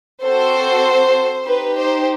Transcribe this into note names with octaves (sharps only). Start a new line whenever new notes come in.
C4 F#4 A4 C5
D#4 G4 B4
C5